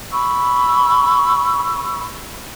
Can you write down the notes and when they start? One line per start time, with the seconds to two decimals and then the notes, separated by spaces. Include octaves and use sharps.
0.12 B5 C#6 E6